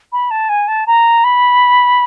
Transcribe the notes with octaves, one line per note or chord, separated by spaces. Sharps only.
B5
A5
G#5
A5
A#5
B5